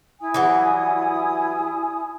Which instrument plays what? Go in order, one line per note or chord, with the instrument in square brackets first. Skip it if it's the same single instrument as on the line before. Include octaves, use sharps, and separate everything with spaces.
[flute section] E4 G#5 D#6
[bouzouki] E3 F#3 G3